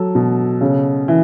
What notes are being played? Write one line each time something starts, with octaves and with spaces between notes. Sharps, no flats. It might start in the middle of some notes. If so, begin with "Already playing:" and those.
Already playing: F#3 A4
B2
C#3
E3